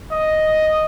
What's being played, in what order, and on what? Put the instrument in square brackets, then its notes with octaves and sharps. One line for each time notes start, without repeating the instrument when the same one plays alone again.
[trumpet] D#5